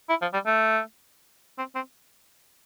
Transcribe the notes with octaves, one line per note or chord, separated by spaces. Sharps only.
E4
F3
G3
A3
C4
C4